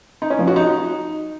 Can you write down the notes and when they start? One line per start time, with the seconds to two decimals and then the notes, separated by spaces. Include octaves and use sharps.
0.22 D#4
0.30 C#4
0.39 F3
0.47 F#4
0.56 D#4